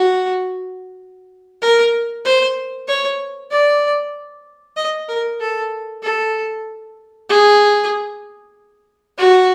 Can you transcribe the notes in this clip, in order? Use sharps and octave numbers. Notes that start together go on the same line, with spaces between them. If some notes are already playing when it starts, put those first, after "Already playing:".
Already playing: F#4
A#4
C5
C#5
D5
D#5
A#4
A4
A4
G#4
F#4